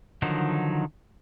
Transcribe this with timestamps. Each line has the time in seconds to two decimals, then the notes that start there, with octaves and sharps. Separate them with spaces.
0.22 D3 D#3 F3 F#3 D#4